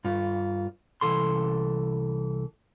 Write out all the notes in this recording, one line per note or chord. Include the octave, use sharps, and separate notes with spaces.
G2 F4
C2 E3 A4 C6